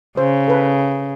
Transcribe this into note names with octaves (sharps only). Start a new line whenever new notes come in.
C#3 C5
A4 B4